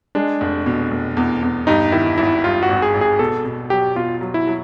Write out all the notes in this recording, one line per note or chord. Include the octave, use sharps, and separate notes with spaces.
G#3 D4
F1
B2
F1
E2
E2
G2 D#4
D#3 E4
G#1 E4
G2 F4
F#4
G#1
G#4
G#1
G#4
B2 A4
B2
F#3 G4
B2 F4
F#3
E4
F#3